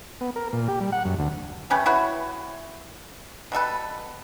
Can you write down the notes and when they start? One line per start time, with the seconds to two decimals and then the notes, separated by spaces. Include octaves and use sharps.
0.21 B3
0.36 A#4
0.53 A#2
0.68 G4
0.80 G3
0.92 F#5
1.05 F#2
1.19 D2
1.70 A3 C#4 G4 B4
1.86 E4 F#4 B4 C#5
3.52 B2 G3 A4 B4